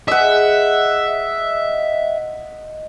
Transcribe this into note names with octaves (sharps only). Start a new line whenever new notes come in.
G#4 B4 D#5 E5 F#5